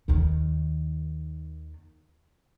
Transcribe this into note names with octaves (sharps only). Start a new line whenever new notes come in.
D#2 D#3